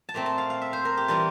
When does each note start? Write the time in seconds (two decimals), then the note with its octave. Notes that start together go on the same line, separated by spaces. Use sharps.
0.09 A5
0.14 A#2 A3 C4 A#5
0.26 A5
0.38 F5
0.50 F5
0.61 E5
0.73 C5
0.85 A#4
0.97 G4
1.08 E3 G3 A#3 F4